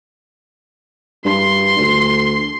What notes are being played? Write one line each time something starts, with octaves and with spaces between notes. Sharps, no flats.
G2 C6
D2